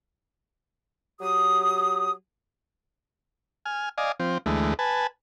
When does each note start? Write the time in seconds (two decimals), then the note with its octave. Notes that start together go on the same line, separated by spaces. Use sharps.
1.20 F#3 G4 D#6
3.66 G#5 F6
3.98 D5 D#5 F5 G#5
4.20 F3 C4
4.46 D2 E3 G#3 A3
4.79 B4 G#5 A5